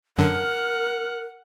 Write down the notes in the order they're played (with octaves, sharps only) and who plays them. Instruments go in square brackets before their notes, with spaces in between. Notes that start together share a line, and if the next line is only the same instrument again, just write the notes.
[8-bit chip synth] F#2 D3 [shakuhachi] A#4 [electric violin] F#5 F6